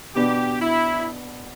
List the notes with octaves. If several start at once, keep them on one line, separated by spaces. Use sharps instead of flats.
B2 B3 D4 G4
E4